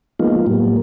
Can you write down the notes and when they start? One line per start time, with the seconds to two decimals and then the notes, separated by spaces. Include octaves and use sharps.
0.19 F3 G#3 A#3 B3 D#4 F4
0.46 A2 F#3 G3 A#3